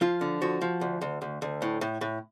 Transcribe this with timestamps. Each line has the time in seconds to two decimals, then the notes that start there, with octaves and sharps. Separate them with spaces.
0.01 F3 F4
0.21 D3
0.42 F3 F#4
0.61 F3
0.81 D2
1.01 D2
1.22 D2
1.42 D2
1.62 A2
1.81 A2
2.01 A2